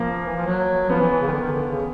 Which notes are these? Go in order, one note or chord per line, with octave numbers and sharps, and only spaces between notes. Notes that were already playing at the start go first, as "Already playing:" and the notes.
Already playing: F3 A#3
E3
F3
F#3
F3 B3
E3
E3
C#3
D#3
D3
D#3
D3
C#3